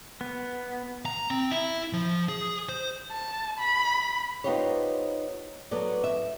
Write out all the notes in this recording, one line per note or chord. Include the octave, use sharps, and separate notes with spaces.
B3
A#5
C4
E4
F3
G#4
C5
A5
B5
B3 D#4 F4 G4 C5 C#5
F#3 B3 A4 C#5 D5
E5